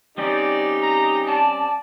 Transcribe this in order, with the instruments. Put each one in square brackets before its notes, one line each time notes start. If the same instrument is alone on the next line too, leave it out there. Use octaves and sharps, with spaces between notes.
[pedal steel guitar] G3 C4 C#4 [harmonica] D#4 G4 [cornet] D5
[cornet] A#5
[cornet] D5 [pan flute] A5